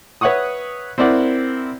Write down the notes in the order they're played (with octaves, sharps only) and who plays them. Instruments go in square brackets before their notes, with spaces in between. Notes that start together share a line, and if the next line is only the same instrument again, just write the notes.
[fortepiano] B4 C#5 E5 F#5 C#6 D#6
C4 E4 A#4 D5 F#5